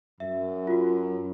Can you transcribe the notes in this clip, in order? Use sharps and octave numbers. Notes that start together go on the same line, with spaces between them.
F#2 E5
F4 F#4